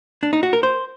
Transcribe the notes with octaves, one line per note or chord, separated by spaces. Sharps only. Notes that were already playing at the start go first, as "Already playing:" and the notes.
D4
D#4
F#4
A#4
C5